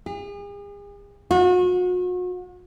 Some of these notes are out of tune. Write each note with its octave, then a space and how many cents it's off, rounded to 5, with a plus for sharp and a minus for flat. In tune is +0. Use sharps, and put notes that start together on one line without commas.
G#4 -40
F#4 -40